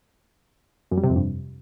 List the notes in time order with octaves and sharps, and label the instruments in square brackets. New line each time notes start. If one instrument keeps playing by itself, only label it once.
[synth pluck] F#2
G3
C3
F2
G2